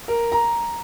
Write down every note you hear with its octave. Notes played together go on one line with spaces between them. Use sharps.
A#4
A#5